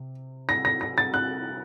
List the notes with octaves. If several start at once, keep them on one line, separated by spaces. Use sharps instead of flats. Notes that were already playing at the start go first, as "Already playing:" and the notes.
Already playing: C3
A#6
A#6
A#6
A6
F#6